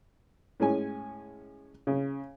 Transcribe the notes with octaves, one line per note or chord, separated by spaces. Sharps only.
A2 G#3 C#4 G#5
C#3